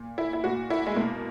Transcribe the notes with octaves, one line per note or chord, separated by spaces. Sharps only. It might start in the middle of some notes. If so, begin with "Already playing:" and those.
Already playing: A#2
E4
E4
A#2 F#4
E4
G#3
B2 A#3